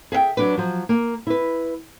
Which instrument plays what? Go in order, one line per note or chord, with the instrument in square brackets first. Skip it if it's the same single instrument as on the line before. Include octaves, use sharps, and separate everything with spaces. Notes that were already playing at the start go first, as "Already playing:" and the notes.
[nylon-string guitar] G#4 E5 F5 G5
F#3 D4 B4
F3 F#3
A#3
E4 B4